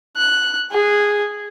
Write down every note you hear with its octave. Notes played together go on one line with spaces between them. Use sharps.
F#6
G#4